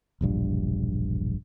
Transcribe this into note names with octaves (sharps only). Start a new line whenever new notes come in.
E1 A#1 G2